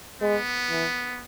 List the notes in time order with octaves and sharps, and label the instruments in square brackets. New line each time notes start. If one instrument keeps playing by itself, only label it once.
[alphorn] G#3 [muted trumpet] B3
[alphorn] E3